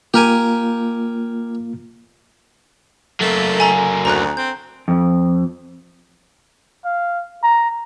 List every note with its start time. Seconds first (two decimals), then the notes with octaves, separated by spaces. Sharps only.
0.14 A#3 F4 G4 A#4 G#5
3.21 F#3 A3 A#3
3.59 A4 G#5 A#5
4.05 D2 A#5 F#6
4.37 C4 G6
4.88 F2
6.85 F5
7.43 A#5